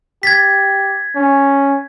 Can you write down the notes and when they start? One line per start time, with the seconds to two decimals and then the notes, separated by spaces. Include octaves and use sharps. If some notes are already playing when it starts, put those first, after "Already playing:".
0.23 G4 G#6 A6 B6
1.16 C#4